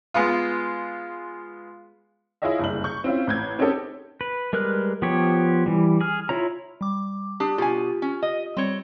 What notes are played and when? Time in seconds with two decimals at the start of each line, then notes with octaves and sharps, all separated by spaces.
0.14 G#3 B3 F4
2.42 E4 F4 G#4 C#5 D#5 E5
2.59 F#1 C2 G2 F#7
2.84 C#6 G6
3.04 C4 C#4 E4 F4
3.27 A1 G6 G#6
3.59 C4 C#4 D#4 G4 A4
4.21 B4
4.53 G3 G#3 A#4 B4 F#6
5.02 F3 B3 G4 C#5
5.66 E3 G3
6.01 G#4 F6
6.29 E4 F4 C#5 A#5
6.81 G3 D6
7.40 D4 G4 D#6
7.58 B2 F4 G4 G#5
8.02 C#4
8.23 D#5
8.57 G3 C4 C#5 G7